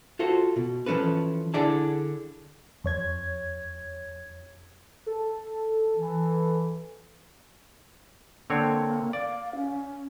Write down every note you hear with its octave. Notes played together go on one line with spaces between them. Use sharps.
F4 F#4 A4 C5
B2
E3 F3 C#4 A4 B4
D3 E4 G#4 D5 F#5 A5
F2 C#5 G#6
A4
E3
D3 A#3 C4 C#5
D5 F5
C#4